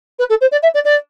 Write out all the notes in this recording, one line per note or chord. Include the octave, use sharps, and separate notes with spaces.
B4
A4
C5
D5
E5
D5
D5